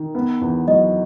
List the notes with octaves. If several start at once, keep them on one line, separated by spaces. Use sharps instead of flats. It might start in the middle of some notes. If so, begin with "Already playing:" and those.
Already playing: D#3
B3
E2
F#3 D#5